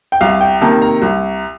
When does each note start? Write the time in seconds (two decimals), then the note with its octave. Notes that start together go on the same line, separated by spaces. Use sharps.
0.12 G5
0.21 C2 F5
0.41 G5
0.61 C3 D#3 A#3 A5
0.82 A#5
1.02 C2